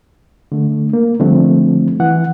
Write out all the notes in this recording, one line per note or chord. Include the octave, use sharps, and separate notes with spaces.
D3 A3
A#3
D3 F3 G3 A3 C4
E3 F#5